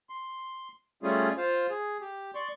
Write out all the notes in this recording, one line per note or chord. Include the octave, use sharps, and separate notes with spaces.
C6
G3 A3 C#4 F4 G#4
F4 C5 F5
G#4
G4
D5 C6 C#6